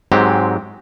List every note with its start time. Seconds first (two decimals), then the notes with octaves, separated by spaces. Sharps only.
0.12 G#2 F#3 G#3 C4 G4